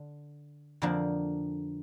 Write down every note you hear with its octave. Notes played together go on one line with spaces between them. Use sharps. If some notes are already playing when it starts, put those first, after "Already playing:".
Already playing: D3 D4
F2 D3 F3 A#3 D4